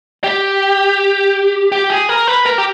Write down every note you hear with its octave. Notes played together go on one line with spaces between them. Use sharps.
G4
G4
G#4
A#4
B4
A#4
G4